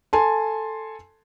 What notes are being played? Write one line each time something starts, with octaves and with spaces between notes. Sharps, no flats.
A4 G#5 A5 C6